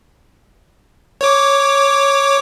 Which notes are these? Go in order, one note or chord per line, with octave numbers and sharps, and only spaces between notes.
C#5 D6